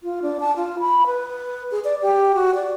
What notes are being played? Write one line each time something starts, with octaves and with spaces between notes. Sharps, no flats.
F4
D4
A5
F4
B5
B4
G#4
D5
G4
F#4
D5